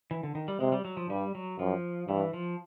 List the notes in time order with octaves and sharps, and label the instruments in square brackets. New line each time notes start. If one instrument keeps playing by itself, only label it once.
[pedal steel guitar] E3
D3
D#3
G3
[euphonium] C3 [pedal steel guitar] G#3
[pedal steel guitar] G3
F#3
F3
[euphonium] G2 [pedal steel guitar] G3
[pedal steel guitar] F#3
[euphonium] F#2 [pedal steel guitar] F3
[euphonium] G2 [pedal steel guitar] E3
[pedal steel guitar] F3